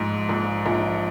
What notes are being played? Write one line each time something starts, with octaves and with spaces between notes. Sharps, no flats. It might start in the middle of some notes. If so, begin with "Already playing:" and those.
Already playing: A#1 G#2
A#1
A#1